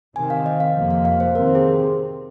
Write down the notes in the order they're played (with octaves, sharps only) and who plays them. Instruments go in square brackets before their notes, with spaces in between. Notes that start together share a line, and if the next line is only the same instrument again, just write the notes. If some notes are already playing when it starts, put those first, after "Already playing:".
[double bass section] C3 D#3 C4 [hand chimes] G#5
[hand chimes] F5
D#5
F5
[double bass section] F2 C3 F3 A#3
[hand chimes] F5
F5
C5
[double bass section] C3 D#3 C4 [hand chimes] A#4
[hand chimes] G#4